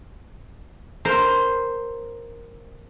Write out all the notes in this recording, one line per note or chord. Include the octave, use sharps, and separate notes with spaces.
A#4 C5